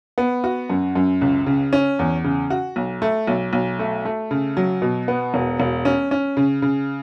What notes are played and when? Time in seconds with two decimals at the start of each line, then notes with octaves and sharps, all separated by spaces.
0.18 B3
0.44 F#4
0.70 F#2
0.95 F#2
1.21 C#2
1.46 C#3
1.73 C#4
1.99 E2
2.24 C#3
2.50 F#4
2.76 B1
3.02 A3
3.27 B1
3.53 B1
3.79 A3
4.05 A3
4.31 C#3
4.57 F#3
4.82 B2
5.08 B3
5.34 E1
5.60 E1
5.85 C#4
6.11 C#4
6.37 C#3
6.62 C#3